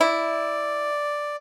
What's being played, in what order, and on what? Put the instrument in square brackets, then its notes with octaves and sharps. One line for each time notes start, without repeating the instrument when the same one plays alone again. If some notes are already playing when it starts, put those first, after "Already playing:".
[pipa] E4 [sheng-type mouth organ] D5